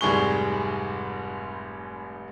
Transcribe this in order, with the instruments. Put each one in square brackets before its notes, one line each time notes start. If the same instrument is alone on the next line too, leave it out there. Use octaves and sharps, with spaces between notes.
[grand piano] F1 G#2 G3 G#4 C#6 G7